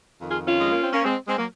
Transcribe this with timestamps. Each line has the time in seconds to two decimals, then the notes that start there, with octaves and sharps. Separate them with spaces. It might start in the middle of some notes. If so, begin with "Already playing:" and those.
0.21 F2 D#3
0.29 F4 G#4
0.47 C#4 F4
0.59 G#3
0.71 A#3
0.82 C4
0.92 A#3 C#4
1.04 G#3 C4
1.28 G#3 C4
1.37 F#3 A#3